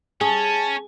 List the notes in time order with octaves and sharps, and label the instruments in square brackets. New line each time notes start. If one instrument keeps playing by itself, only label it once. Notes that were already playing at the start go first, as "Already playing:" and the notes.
[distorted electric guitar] C#4 [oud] G#4 [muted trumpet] A5